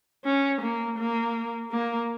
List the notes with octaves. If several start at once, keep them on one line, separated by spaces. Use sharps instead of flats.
C#4
A#3
A#3
A#3